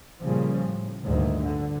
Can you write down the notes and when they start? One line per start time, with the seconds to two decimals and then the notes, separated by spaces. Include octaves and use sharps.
0.22 A#2 C#3 F3 G3
0.64 A2
1.04 D2 G2 A#2 D#3
1.41 D3